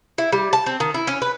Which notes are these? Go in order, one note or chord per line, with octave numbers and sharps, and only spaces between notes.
E4
G3
A5
C4
D#3
E4
C#4
B4